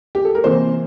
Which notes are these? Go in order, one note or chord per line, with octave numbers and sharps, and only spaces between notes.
G4
A4
A#4
C3 E3 A#3 C5